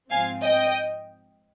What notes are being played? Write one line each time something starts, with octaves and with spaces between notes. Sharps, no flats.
G#2 F3 C4 F5 G#5
D#5 G5